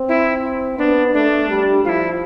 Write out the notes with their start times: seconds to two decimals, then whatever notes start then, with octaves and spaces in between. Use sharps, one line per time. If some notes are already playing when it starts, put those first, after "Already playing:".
Already playing: C4
0.09 E4
0.78 B3 D4
1.14 A3 D4
1.49 G3
1.85 F3 E4 F4